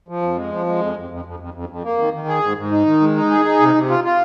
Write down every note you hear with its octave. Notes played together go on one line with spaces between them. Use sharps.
F3
F2
G#3
F3
G#3
F2
F2
F2
F2
F2
F2
F2
A#3
D#3
D#3
G#4
G#2
G#2
D#4
D#3
G#3
D#4
G#4
D#4
C3
C3
F4
F4